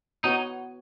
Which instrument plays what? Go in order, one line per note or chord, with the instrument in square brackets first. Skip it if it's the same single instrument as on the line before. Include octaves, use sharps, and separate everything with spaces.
[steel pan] B3 F#4 C#5 [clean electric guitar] D#4